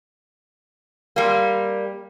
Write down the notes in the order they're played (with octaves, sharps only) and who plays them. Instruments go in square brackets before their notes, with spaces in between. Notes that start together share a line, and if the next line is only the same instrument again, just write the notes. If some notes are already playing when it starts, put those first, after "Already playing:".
[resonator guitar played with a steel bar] G3 A#3